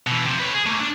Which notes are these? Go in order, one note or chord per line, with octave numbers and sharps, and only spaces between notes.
B2 E3
C3 F3
B4 C#5
G#4
A3 A#3
D4